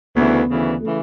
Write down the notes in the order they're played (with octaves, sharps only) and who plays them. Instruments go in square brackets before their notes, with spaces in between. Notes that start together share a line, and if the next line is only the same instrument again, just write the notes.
[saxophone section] D2 C#3 E3 [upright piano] B3
[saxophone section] D2 C#3 E3
[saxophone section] C#3 E3 [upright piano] A3